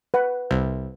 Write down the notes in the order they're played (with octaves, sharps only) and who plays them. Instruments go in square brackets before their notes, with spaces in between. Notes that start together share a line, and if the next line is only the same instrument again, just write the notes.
[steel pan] B4 F#5
[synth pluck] C2